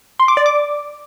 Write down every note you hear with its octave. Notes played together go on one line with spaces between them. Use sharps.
C6
D6
D5
D6